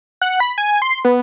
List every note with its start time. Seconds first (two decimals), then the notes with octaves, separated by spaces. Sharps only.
0.21 F#5
0.40 B5
0.58 G#5
0.82 C6
1.05 B3